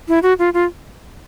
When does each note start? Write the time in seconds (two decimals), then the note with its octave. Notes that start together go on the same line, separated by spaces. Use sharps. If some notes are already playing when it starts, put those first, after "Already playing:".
0.08 E4
0.23 F#4
0.39 F4
0.54 F4